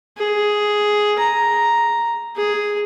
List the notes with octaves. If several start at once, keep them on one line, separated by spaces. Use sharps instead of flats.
G#4
A#5
G#4